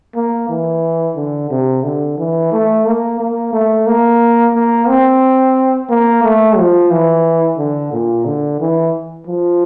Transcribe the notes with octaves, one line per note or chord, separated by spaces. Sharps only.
A#3
E3
D3
C3
D3
E3
A3
A#3
A#3
A3
A#3
A#3
C4
A#3
A3
F3
E3
D3
A#2
D3
E3
F3